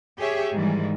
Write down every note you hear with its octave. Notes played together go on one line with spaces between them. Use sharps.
G4 G#4 C#5 E5
G#2 D#3 E3 G3 G#3